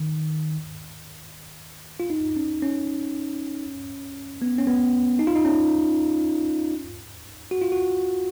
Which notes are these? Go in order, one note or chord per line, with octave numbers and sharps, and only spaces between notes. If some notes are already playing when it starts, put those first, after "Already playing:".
Already playing: D#3
F4
D#4
C#4
C#4
B3
C#4
B3
D#4
F4
D#4
C#4
F#4
F4
F#4